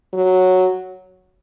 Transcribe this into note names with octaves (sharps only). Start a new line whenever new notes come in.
F#3